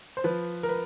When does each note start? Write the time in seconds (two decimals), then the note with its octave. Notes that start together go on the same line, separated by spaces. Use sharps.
0.17 C5
0.24 F3 B4
0.63 A#4
0.69 B4